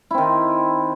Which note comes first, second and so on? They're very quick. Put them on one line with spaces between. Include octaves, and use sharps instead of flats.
E4 C4 D#3